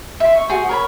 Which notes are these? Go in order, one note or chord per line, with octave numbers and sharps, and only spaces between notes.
E5 C6
C#6
F#4 G#4 C5
A#4 C#5 B5